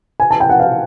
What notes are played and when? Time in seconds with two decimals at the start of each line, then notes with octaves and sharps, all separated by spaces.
0.20 G#5
0.31 A5
0.40 G5
0.49 F#5
0.59 F5